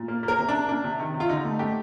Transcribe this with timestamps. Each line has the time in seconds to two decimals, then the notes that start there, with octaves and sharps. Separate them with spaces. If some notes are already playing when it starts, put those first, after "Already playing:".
Already playing: A#2
0.08 A#3
0.23 A#3
0.28 A#4
0.38 C3
0.49 D4
0.54 C3
0.69 A#3 D4
0.84 C3
1.00 D#3
1.14 C3
1.20 F4
1.29 D3 D#4
1.45 A3
1.59 A3 G4